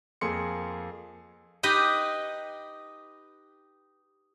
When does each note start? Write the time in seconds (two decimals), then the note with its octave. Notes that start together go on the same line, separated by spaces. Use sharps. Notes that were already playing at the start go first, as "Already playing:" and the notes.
0.21 F2 A#3 G#4 C6 C#7
1.63 D#4 G4 B4 D#5